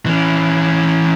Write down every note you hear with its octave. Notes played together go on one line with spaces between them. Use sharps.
E3 C#4